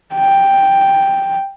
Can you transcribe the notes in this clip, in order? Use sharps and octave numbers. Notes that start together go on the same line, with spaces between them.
G5